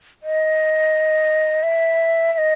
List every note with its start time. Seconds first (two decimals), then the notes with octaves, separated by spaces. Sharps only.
0.23 D#5
1.63 E5
2.33 E5
2.38 D#5